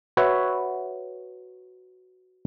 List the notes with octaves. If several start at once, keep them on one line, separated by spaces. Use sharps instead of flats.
F#4 B4 C#5 E5